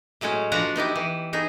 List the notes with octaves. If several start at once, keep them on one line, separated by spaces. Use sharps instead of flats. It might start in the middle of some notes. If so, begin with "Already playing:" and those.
A2 F#3 G#3 C#4 C#5
F3 D4 F#4 B4 A#5
B3 D#4 E4 G4
E3
B3 D#4 G#4